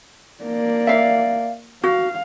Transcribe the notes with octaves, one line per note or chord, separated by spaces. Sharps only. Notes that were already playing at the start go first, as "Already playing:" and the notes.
A#3 D5
E5 F5
F#4 F5